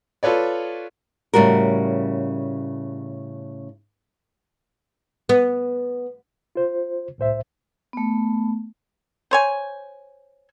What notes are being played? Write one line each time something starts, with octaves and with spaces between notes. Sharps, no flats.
F4 A4 B4 C#5 D5
A2 C#3 G3 F#4 A#4
B3
F4 C5
C2 A2 C5 E5
A3 B3
C5 C#5 G#5